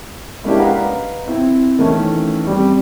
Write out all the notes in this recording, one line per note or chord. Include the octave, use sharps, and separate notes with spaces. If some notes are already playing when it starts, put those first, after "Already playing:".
G#3 A#3 C#4 D4 E4 G4
B4 D#5 F5 F#5 A#5
C4 E4
D#3 E3 A3 C#4
G3 C4 G4